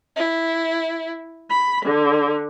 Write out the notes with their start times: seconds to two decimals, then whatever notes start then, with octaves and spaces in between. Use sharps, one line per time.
0.17 E4
1.48 B5
1.83 D3